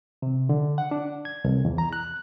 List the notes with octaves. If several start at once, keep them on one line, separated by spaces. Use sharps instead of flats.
C3
D3
F#5
D4
G#6
C2
E2
A#5
F#6